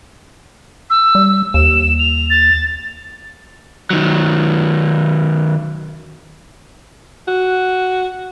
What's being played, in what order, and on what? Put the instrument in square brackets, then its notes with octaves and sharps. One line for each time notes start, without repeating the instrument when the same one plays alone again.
[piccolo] E6
[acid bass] G3
[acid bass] D#2 [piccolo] E7
[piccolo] F7
A6
[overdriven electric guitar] D#3 F#3
[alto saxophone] F#4